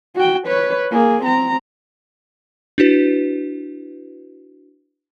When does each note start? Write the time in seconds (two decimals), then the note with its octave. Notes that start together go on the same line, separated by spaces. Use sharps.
0.16 F#4 G5
0.47 B4 C#5
0.91 A#3 G#4
1.23 C4 A#5
2.78 D4 E4 F#4 B4